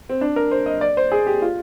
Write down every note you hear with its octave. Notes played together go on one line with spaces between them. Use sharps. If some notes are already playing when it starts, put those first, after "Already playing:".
C4
D4
A#4
C5
D#5
D5
C5
G#4
G4
F4